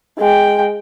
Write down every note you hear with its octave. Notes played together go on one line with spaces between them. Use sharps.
G#3 G5